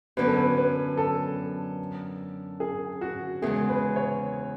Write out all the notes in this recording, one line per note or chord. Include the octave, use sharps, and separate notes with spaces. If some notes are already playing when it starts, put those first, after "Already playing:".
F#2 D3 F#3 B3 B4
A4
B4
B4
A4
G#4
F#4
E2 C#3 G#3 G#4
B4
C#5